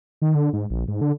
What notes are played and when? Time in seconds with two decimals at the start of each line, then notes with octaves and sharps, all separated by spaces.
0.22 D#3
0.35 D3
0.53 G#2
0.70 A#1
0.88 G#2
1.01 D3